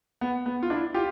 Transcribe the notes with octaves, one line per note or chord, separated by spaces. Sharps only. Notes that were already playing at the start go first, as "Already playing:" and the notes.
B3
B3
F4
D4 E4
F4 G4